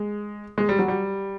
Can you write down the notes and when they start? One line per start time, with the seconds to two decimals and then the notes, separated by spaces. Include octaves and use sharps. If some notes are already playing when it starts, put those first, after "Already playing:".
Already playing: G#3
0.58 G#3
0.69 G3
0.79 F#3
0.88 G3